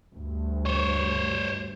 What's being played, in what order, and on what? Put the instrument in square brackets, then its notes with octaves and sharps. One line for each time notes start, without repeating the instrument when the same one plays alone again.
[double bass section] D2 G2
[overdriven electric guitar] C5 C#5